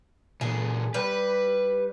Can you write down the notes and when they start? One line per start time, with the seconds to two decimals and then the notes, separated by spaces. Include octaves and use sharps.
0.41 A#2 E3 G#4
0.94 G3 B4 B5